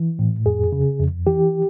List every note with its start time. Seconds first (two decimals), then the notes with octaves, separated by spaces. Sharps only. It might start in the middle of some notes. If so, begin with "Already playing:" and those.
Already playing: E3
0.19 A2
0.46 F2 G#4
0.72 C#3
1.00 F2
1.27 E3 G4